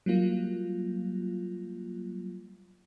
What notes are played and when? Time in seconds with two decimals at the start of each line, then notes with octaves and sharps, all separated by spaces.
0.06 F#3 G3 A#3 F4